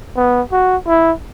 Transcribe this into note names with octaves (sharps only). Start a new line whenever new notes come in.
B3
F#4
E4